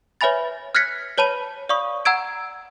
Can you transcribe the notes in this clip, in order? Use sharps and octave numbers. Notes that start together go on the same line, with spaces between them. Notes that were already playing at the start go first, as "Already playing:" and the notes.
B4 C#5 E5 G#5 B5 A6
F6 F#6 G#6 A#6 B6 C#7
B4 C#5 A5 B5 D#7
D5 F5 B5 C#6 D#6
F#5 A#5 E6 G#6 D7